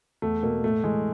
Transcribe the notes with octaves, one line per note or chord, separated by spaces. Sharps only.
E2 A3
B2 A#3
A2 A3
E3 G#3